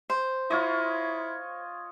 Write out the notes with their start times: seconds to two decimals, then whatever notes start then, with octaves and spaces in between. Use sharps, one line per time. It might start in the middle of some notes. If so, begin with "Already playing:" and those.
0.10 C5
0.50 E4 F4 C#5 D#5